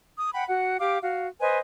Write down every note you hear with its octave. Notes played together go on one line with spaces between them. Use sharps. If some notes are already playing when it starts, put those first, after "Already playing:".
D#6
F#5 G5 B5
F#4 F#5
G4 F5 D6
F#4 F5
B4 C5 D#5 G#5